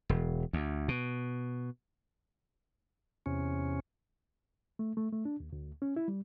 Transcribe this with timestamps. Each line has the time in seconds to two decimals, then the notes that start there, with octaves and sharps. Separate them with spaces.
0.09 E1
0.53 D2
0.88 B2
3.26 E2 C3 C#4
4.79 A3
4.97 A3
5.12 A3
5.25 D4
5.40 D#2
5.53 D2
5.82 C#4
5.96 E4
6.08 G3